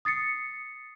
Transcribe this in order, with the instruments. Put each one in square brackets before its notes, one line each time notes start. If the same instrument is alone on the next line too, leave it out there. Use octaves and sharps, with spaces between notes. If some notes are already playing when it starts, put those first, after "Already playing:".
[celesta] D#6 A6 C7 C#7